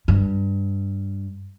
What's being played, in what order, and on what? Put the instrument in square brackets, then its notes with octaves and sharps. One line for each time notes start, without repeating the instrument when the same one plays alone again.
[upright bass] G2